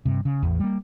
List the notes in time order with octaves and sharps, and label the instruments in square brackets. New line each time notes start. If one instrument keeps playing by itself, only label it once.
[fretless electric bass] G2 C3
C#3
A1 E2
G3 A#3